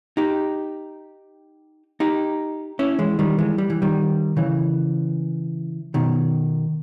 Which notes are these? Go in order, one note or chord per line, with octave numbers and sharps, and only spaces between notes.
D#4 G4
D#4 G4
C#4 E4
E3 G#3
D#3 G3
E3 G#3
G3
E3
D#3 G3
C#3 E3
B2 D#3